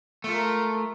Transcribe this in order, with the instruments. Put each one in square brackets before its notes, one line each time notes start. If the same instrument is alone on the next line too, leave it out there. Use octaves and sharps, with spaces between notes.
[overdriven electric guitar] A3 [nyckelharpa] F4 A#4